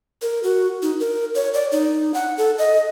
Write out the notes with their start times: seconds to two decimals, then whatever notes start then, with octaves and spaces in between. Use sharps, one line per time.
0.22 A#4
0.43 F#4
0.83 D#4
1.00 A#4
1.35 C#5
1.54 D5
1.72 D#4
2.14 F#5
2.38 A4
2.58 D#5